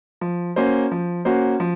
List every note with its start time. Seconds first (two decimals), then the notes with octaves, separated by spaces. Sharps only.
0.21 F3
0.56 A#3 C#4 F#4 C5
0.92 F3
1.25 A#3 C#4 F#4 C5
1.60 F3